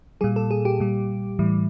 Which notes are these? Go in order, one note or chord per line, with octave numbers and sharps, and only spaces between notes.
A#2 G3 G#4
A4
G#4
G4
A#2 G3
A2 E3 G3